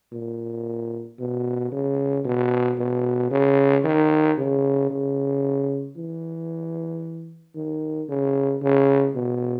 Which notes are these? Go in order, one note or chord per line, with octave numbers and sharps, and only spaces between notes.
A#2
B2
C#3
B2
B2
C#3
D#3
C#3
C#3
E3
D#3
C#3
C#3
B2